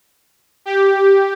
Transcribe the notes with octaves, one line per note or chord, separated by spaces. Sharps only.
G4